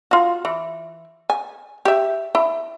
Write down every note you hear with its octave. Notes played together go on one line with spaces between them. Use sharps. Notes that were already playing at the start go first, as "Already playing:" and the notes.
F4 F#4
E3
G#5
G4 E5
E4